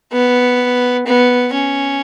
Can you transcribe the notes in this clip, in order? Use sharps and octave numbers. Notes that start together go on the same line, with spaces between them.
B3
B3
C#4